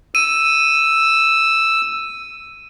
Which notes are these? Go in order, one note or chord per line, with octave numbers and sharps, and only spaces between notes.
E6 D#7